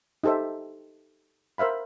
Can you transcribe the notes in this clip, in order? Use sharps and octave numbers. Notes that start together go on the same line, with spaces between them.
D#4 G4 A4 C5 E5
A#4 C5 E5 F5 B5